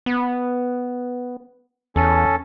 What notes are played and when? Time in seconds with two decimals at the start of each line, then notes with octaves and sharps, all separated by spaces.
0.06 B3
1.96 E2 C#4 A4